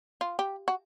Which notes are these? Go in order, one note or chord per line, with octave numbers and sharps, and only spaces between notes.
F4
G4
F#4